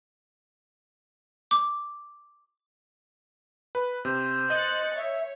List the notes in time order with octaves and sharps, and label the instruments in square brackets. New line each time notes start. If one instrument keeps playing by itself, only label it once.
[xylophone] D6
[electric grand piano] B4
[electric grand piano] C3 [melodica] C5
[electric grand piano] D#5 G6 D#7 [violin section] F#6 A6 C#7
[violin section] C#5 [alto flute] E5